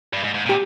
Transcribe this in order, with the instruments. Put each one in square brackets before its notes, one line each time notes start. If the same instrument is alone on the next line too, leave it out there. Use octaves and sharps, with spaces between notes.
[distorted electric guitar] G2
G#2
G#2
A#2
[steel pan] G4